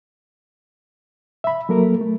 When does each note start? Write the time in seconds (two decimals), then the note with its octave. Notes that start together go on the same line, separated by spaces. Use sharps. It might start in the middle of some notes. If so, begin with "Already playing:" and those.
1.44 E5 B5
1.69 F#3 A#3 A4 A#4
2.01 A3